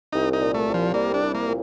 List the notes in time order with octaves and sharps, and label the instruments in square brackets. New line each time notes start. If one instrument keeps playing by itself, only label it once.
[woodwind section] C2 [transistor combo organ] D#4
[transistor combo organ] D#4
[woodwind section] A#2
[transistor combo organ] A3
[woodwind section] C2
[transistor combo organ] F3
[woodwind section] G3 [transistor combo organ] A#3
[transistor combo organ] D4
[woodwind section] C2
[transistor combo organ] A#3
[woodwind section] A#2